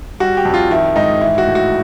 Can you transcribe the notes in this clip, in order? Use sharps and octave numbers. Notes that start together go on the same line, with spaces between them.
G3 F#4
G4
F2
F4
D#3 E4
G#2 D#4
E3 E4
F#4
A2
F#4